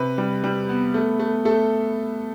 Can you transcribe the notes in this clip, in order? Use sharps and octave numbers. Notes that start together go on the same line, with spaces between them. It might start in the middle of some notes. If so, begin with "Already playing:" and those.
Already playing: C3 B4
G3
G3
B3
A3
A3
A3 A4